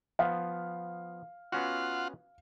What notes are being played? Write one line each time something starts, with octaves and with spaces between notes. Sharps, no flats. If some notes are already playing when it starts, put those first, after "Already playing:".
F3 B3 F5
B3 C#4 F4 F#4 F#5 C6